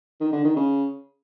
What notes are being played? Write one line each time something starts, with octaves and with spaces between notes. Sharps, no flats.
D#3
D3
D#3
C#3